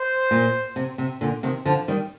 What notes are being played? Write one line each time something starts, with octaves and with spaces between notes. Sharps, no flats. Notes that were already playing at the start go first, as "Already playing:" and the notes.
Already playing: C5
A#2
C3
C3
A#2 D3
C3 D#3
D3 F3
D#3 G3